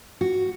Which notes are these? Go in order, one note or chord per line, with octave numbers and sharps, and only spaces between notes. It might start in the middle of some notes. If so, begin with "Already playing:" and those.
F#4